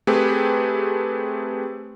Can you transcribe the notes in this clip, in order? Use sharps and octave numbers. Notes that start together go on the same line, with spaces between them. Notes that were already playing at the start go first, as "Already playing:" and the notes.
A3 C4 G4 G#4 B4